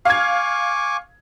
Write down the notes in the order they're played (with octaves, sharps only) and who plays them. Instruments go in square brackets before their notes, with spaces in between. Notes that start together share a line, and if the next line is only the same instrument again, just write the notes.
[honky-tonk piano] F5 G#6 [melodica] G#5 C#6 D6